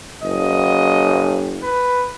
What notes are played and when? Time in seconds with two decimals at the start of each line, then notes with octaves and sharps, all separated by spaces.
0.23 F#1 D#5
1.63 B4